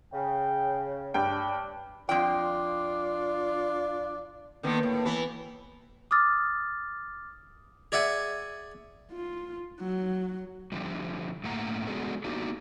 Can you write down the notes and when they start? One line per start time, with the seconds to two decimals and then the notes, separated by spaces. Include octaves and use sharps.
0.13 C#3 G5
1.14 G2 D4 G5
2.09 F2 D4 F4 G5
4.63 D3 D#3 A#3 B3
4.83 A2
5.05 E3 B3 B4
6.11 D6 D#6 F6 A6
7.92 G#4 D5 E5 F#5 G#5
9.12 F4
9.80 F#3
10.72 D3 F3 G3
11.44 A2 A3 A#3 F#5 A#5
11.87 G#3 B3 D4 F#4 G#4 A4
12.24 A#3 B3 D4 D#4 F#4 G4